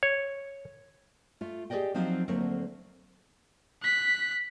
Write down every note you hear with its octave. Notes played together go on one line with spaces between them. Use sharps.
C#5
A3 F4
G4 G#4 B4 D5 D#5 G5
F3 F#3 C4 D#4 F4
D2 F#3 A3 A#3 C4 C#5
F#6 B6